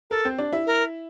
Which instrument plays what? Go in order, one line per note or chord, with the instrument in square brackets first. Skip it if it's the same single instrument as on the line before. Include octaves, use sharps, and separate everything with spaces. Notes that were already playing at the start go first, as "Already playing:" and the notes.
[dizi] A4 [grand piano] A#4
[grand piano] C4 C5
D4 D5
E4 E5
[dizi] A#4